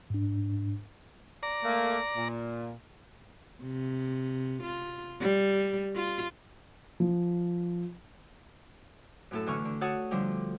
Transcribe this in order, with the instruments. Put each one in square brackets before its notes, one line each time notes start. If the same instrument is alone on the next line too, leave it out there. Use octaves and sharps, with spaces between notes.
[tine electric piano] G#2 D4
[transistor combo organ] D5 A#5
[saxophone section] A3 A#3
A#2
[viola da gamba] C3
F4
G3
F4
[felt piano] F3
[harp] F#2 A2 A4
D3 E3 A3 G#5 C#6 F6
D3
F#4 A4 C#5 F#5 A5 D#6
D3 F3 G3